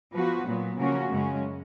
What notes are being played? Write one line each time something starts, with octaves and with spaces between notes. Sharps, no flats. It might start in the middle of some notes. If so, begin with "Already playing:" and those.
F3 B3 F#4 B4
A#2 F#3 B3
C#3 F3 A#3 C#4 F#4
F#2 C#3 G#3 C#4